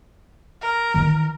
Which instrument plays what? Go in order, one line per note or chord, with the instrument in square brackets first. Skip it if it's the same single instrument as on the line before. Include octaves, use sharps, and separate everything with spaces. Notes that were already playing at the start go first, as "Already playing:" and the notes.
[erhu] A#4
[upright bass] D#3 E3